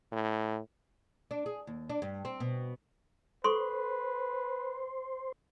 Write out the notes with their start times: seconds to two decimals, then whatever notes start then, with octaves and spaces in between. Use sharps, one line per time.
0.12 A2
1.31 D4
1.46 G#4
1.67 D#2
1.90 D4
2.02 G2
2.25 C4
2.40 B2
3.44 A4 B4 C5 C6 C#6